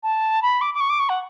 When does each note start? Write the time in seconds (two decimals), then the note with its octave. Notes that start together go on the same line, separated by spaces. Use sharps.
0.03 A5
0.42 B5
0.61 D6
0.74 D6
0.80 C#6
0.90 D6
1.00 C#6
1.09 F#5